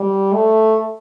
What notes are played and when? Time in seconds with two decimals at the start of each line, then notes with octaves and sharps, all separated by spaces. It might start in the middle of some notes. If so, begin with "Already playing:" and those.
Already playing: G3
0.33 A3